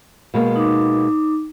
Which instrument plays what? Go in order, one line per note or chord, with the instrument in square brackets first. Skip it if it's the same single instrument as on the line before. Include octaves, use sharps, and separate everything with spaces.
[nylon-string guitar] B2 G#3 A#3
[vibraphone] D#4 D6